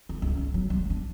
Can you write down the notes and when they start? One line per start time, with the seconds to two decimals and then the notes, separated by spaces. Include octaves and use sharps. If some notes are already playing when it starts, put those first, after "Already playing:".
0.09 D3
0.22 C#2
0.37 G#3
0.54 F#3
0.70 G#3
0.90 D4